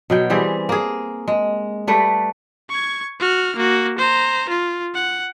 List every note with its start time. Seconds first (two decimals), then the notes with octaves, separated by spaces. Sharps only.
0.10 B2 F#3 G5
0.30 E3 G3 C4 G#4
0.69 A#3 G#4
1.28 G#3
1.87 G3 A3 B4
2.69 C#6 G#6
3.20 F#4 F6
3.56 A#3 F#4
3.98 C5 A#5
4.49 F4
4.94 F#5